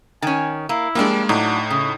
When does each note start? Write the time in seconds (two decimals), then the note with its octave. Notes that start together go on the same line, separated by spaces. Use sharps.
0.22 D#3 C#4 G#5
0.69 A#3 E4
0.95 F3 G3 G#3 A#3 D4
1.29 A2 F#3 D4 D#4
1.70 C#3 D#5